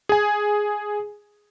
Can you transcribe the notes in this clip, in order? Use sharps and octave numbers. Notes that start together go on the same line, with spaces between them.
G#4 G#5